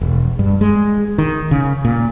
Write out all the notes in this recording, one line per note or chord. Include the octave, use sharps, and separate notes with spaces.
E1
G2
G#3
D#3
C#3
A#2